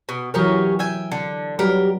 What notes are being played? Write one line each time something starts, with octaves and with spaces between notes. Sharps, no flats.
B2
E3 F#3 C#4 G4 G#4 A#4
E5 G5 G#5
D3
F#3 G3 G4 A#4 B4